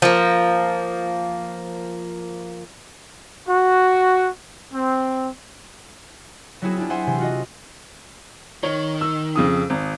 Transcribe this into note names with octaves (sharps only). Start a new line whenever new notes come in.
F3 A#3
F#4
C4
F#3 B3 C4 E4 F#4 G#4
D4 E4 F4
C5 E5 F#5 G#5 C6
C3 E3 C6
F4 F#4 D#5
D#3 C#5
E6
F2 C#3 D#6
G#1